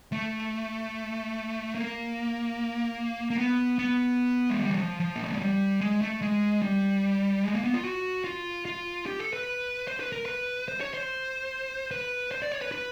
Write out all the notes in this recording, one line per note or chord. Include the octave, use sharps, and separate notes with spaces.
A3
A#3
A#3
B3
B3
G#3
G3
E3
F3
F3
A#3
A3
G#3
G3
G#3
A3
G#3
G3
G#3
A#3
B3
F4
F#4
F4
F4
G4
A4
B4
C5
B4
A#4
B4
C5
C#5
C5
B4
C5
D5
C#5
B4
B4